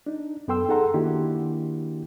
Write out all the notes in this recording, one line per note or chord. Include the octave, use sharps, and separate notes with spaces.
D4 D#4
F#2 B3 A4 G5 C6 E6
D#4 G#4 A4 F#5 A#5 C6
D#3 A#3 D4 E4 F#4 G4